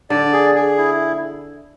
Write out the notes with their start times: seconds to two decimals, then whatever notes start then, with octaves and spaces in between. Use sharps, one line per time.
0.10 D3 D5
0.33 G#4
0.55 G#4
0.77 E4